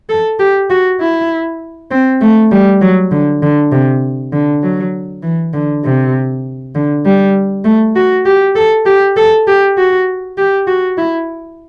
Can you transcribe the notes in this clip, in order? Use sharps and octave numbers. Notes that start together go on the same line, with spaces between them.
A4
G4
F#4
E4
C4
A3
G3
F#3
D3
D3
C3
D3
F#3
E3
D3
C3
D3
G3
A3
F#4
G4
A4
G4
A4
G4
F#4
G4
F#4
E4